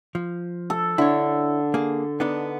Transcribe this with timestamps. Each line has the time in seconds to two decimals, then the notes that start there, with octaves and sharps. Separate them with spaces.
0.15 F3
0.70 A4
0.98 D3 E4 C#5
1.74 A#3 G#4
2.20 B3 D4 D#4